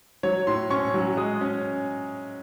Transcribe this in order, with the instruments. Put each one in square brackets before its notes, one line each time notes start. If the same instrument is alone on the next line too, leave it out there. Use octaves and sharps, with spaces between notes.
[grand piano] F#3 C#5
A2 C6
C#4 C#6
F#3
G#3 D#6
C#4